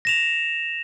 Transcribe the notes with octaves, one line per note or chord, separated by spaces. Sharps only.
A#6 E7 F7